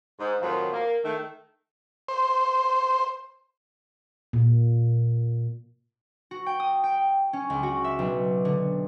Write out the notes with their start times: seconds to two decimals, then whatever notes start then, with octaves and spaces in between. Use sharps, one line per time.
0.19 G#2
0.40 F2 A2 D#3 F3 F#3
0.73 A#3
1.04 D#3 A3
2.08 C5
4.33 A#2
6.31 F#4
6.46 G5
6.60 D#6
6.84 G5
7.33 C#4
7.50 C#2
7.63 F#4
7.84 E5
7.99 B1
8.45 D3